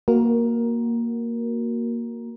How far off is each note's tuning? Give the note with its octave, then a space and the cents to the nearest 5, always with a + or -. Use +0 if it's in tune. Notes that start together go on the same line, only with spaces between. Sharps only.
A#3 +0 F#4 +0 A#4 +10